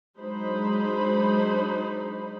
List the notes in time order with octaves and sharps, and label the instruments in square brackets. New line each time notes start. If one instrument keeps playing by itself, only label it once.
[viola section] F#3 G#3 D4 D#4 C5 B5